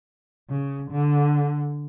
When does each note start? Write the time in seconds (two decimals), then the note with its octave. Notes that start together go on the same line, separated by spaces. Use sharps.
0.50 C#3
0.91 D3